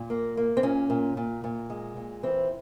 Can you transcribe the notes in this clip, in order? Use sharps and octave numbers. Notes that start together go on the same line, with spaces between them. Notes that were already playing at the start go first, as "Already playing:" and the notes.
Already playing: A#2
A#3
A#3
C4
A#2 C#4
A#2
A#2
A#2
G#3
A#2
E3 C4